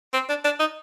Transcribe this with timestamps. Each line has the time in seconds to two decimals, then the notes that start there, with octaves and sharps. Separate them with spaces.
0.14 C4
0.29 D4
0.44 D4
0.60 D#4